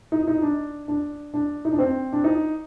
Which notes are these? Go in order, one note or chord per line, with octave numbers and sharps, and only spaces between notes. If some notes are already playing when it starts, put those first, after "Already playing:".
D#4
D#4
D4
D4
D4
D#4
D4
C4
D4
D#4